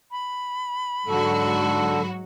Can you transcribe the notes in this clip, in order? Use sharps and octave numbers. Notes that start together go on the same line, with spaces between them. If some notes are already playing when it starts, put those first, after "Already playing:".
B5
G#2 D3 F#3 F#4 A4